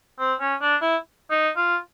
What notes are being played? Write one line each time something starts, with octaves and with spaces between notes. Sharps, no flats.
C4
C#4
D4
E4
D#4
F4